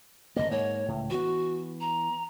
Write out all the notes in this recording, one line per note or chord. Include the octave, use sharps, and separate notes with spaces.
G#1 E2 A#3 D#5
G#2 A#3 C#5
C#2 A2
E3 B3 F#4
A#5